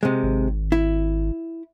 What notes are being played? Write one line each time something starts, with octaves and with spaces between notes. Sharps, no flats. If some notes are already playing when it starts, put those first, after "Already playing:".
C3 G#3
G#1
E4